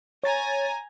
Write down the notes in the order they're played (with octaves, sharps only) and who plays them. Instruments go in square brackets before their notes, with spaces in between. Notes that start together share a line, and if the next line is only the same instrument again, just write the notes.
[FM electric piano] C#5 A6 [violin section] G#5 A#5